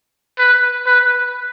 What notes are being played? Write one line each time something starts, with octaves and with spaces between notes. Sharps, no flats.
B4
B4